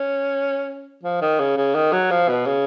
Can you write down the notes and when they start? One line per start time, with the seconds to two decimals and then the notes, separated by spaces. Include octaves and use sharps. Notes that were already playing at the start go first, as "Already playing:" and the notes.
Already playing: C#4
1.03 F3
1.21 D#3
1.39 C#3
1.57 C#3
1.75 D#3
1.92 F#3
2.11 F3
2.29 B2
2.47 C#3